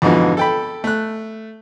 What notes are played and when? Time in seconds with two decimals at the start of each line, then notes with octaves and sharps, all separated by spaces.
0.02 F2 G#2 B2 D3 E3
0.37 A4 G5 B5
0.84 A3 F#6